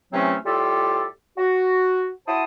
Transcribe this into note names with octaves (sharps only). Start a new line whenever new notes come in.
C3 E3 F#3 A3 C4 C#4
A2 G3 F4 G4 A4
F#4
E4 F#4 C5 A5 D#6